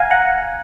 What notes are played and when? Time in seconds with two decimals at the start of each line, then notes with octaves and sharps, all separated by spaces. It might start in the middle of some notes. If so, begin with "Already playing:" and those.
Already playing: F5 F#5 G#5 A#5
0.10 F#5 A#5